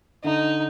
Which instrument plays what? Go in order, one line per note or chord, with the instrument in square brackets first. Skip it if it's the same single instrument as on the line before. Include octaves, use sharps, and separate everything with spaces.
[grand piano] D3 [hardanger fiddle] D#4